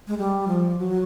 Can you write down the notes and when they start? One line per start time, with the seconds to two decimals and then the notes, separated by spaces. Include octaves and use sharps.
0.08 G#3
0.18 G3
0.48 F3
0.79 F#3